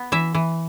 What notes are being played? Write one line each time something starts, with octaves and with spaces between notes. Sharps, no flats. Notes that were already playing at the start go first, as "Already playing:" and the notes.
Already playing: B3
E3 E5
E3